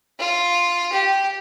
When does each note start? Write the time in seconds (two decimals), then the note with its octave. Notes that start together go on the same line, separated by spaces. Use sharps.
0.19 F4
0.92 G4